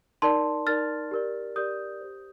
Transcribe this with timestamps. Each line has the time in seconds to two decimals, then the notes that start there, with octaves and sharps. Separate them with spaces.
0.22 D#4 A#4 D5 A5 C6
0.67 D#4 A#4 D5 F6 A6
1.11 G4 A#4 D5
1.56 G4 A#4 D5 D#6 G6
2.01 G4 C5